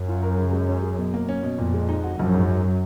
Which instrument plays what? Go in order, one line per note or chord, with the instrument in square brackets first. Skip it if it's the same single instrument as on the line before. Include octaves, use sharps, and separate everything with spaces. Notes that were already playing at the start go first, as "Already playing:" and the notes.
Already playing: [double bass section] F#2
[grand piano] F4
A#4
C#3
G#3
C#4
G#4
B2
A#3
C#4
B2
[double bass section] F2 [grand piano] A#2
[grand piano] G#3
D#4
F#4
[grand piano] A#1 [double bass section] F#2
[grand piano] G#2
F#3